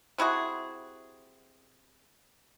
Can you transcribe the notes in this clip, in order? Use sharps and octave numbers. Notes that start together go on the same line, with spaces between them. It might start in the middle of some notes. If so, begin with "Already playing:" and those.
C3 E4 F#4 G#4